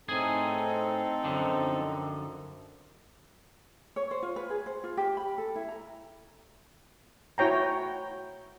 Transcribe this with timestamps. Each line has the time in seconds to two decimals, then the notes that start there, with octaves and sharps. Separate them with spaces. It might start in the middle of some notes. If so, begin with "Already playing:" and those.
0.09 A2 C4 D#4 G#4 A4 G#5
1.24 F#2 D3 F3
3.96 C#5
4.11 C5
4.23 F4
4.36 B4
4.50 G#4
4.66 C5
4.84 F4
4.97 G4
5.17 B5
5.38 A4
5.56 E4
5.69 A#5
7.38 E4 F#4 C#5 G5 A#5